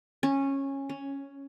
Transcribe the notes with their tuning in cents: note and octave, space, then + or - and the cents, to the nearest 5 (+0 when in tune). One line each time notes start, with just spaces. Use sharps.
C#4 -15
C#4 +5